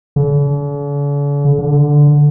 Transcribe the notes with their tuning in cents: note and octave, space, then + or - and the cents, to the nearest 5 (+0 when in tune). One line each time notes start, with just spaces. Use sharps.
D3 -45
D3 +0